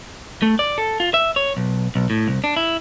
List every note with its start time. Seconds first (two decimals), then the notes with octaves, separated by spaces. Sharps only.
0.42 A3
0.59 D5
0.78 A4
1.00 F4
1.14 E5
1.36 C#5
1.57 B1
1.95 B1
2.10 A2
2.28 C2
2.44 D4
2.56 E4